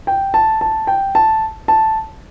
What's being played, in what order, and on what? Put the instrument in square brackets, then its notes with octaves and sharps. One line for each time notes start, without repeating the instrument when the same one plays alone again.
[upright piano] G5
A5
A5
G5
A5
A5